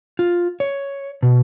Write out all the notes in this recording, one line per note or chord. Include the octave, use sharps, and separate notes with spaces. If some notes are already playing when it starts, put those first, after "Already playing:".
F4
C#5
B2